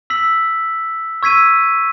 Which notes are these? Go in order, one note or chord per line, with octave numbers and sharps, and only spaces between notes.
E6 B6 F#7
C#6 E6 G#6 B6 D#7